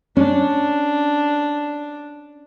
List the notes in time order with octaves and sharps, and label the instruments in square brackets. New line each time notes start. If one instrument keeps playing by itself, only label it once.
[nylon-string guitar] C#4 [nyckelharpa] D4